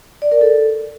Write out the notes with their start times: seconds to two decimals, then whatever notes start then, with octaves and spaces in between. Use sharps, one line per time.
0.22 D5
0.32 A#4
0.41 A4